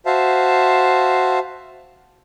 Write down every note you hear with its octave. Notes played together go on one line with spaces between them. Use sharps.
F#4 C5 E5 F5 A5